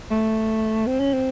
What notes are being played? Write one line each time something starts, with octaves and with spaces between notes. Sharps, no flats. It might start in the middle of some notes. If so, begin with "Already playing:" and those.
A3
C4
C#4
C4